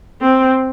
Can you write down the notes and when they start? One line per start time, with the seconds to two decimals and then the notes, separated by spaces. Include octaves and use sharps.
0.21 C4